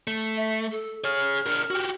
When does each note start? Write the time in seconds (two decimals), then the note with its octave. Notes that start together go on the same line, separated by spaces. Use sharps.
0.07 A3
0.37 E5
0.71 A4
1.04 G#4 C#5 F6
1.46 D4 A#4
1.71 F#4 G4